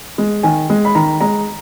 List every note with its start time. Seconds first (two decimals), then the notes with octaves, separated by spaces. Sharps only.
0.18 G#3
0.43 D#3 G#5
0.70 G#3
0.85 B5
0.95 D#3 A#5
1.21 G#3 A#5